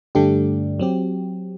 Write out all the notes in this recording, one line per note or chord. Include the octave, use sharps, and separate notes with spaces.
G2 D3 A3 D4 G4
F#3 C4 G4